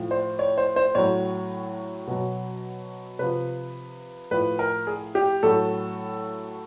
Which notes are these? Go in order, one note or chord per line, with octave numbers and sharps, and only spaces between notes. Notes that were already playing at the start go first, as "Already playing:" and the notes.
Already playing: A2 F3
C5
C#5
C5
C5
A2 F#3 C#5
B2 F#3
C3 F3 B4
A2 F3 B4
A#4
G#4
G4
A2 F#3 A4